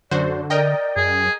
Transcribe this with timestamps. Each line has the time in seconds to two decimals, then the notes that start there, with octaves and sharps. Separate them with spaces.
0.11 F#2 D3 F#4 C5 D5
0.50 A#4 D5 D#5 G5
0.96 F#2 G#4